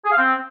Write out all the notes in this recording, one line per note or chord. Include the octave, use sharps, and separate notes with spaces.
G#4
F5
C4